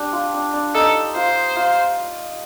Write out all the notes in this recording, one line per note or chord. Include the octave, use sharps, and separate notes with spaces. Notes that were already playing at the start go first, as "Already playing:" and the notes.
Already playing: D4 G4
F4
D4
D4
D#4 A4
F4 C5
F4